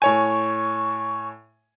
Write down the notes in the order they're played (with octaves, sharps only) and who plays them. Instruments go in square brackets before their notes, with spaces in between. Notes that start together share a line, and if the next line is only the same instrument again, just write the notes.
[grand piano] A2 C#5 G#5 [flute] C#6